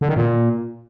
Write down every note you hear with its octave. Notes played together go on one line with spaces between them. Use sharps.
D3
D#3
A#2